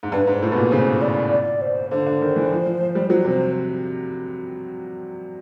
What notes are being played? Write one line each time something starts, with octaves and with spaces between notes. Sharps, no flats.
G#2
G2 B4
G#2
C5
A2
B2 B4
A#2
C#3 C5
D5
D5
C5
D3 C5
D3
D#3
E3
F3
F3
F3
G3
F#3 C5
C3
C5